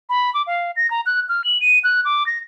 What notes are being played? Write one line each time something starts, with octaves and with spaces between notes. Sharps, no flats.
B5
D6
F5
A#6
A#5
F#6
F6
F#7
D#7
F#6
D6
A#6